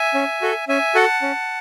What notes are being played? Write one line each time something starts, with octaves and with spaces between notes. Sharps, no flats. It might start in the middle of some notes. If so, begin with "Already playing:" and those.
Already playing: E5 G#5
C#4
F#4 A4
C#4 E5 G#5
F#4 A4 F#5 A5
C#4